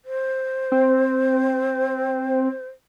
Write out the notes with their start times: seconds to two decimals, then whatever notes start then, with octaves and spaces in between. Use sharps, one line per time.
0.05 C5
0.72 C4